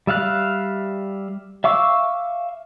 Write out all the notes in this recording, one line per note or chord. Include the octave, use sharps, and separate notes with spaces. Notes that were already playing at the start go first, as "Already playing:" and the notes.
G3 E5 F5 F#6
E5 F5 C#6 D6 E6